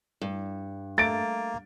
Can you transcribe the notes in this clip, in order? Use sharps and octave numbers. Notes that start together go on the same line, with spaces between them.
G2
A3 A#3 A6 D7